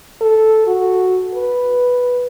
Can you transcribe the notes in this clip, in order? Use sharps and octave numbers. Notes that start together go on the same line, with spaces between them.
A4
F#4
B4